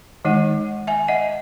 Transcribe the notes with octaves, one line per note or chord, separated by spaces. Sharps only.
D#3 G#3 D#4 D#5 F#5
E5 G#5
D#5 F#5